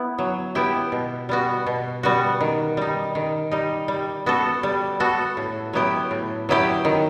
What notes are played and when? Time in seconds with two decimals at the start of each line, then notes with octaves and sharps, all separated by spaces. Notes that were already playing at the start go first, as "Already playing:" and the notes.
Already playing: B3 E4
0.19 F#3
0.55 B3 E4 G4
0.92 B2
1.29 G3 B3 F#4
1.67 B2
2.03 G3 B3 F#4
2.41 D#3
2.77 G3 D#4
3.15 D#3
3.51 G3 D#4
3.88 G3
4.26 B3 F#4 A4
4.63 G3
5.00 B3 F#4 A4
5.37 A2
5.73 F#3 B3 E4 G4
6.11 A2
6.49 F#3 B3 E4 G4
6.85 D#3